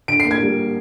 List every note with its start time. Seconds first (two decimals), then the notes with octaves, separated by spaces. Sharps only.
0.08 D3 D7
0.20 C7
0.25 A#3
0.31 G#6
0.42 G3